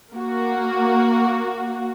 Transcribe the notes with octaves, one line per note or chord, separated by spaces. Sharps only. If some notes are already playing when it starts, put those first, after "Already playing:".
A#3 F#4